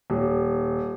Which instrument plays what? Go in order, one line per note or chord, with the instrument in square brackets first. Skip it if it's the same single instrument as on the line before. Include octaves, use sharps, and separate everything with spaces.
[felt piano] D#1